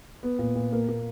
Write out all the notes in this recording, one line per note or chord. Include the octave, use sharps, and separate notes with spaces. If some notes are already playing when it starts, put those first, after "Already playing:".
B3
A#2
A#2
A#3
A#3